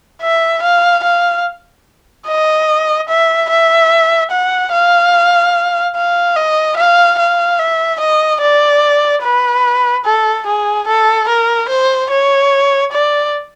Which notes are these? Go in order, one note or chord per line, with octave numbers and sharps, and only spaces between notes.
E5
F5
F5
D#5
E5
E5
F#5
F5
F5
D#5
F5
F5
E5
D#5
D5
B4
A4
G#4
A4
A#4
C5
C#5
D5